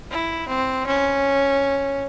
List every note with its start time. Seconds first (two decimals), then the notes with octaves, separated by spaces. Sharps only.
0.11 E4
0.48 C4
0.87 C#4